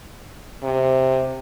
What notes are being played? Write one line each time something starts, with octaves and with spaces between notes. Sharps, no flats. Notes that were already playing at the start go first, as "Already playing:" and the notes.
C3